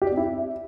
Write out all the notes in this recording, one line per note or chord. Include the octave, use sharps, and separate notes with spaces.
G4
D5
C4
E4